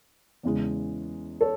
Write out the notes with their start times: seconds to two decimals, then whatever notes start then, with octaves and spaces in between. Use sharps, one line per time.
0.43 E2 C#3 E3 G#3
1.41 A4 C#5